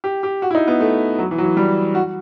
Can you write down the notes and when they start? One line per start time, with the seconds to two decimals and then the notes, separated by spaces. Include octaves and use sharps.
0.04 G4
0.23 G4
0.42 F#4
0.50 E4
0.55 D#4
0.68 B3
0.80 A3
1.19 F#3
1.31 E3
1.38 F#3
1.44 E3
1.57 G3
1.95 F#4